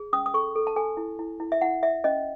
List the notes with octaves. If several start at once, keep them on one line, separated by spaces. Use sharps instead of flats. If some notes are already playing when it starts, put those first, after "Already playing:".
Already playing: G#4
C#4 D#6
D#6
A4 C#6
A4
A5
A4 G#5
E4
E4
E4
E5
E4 F#5
E4 E5
C#4 D#5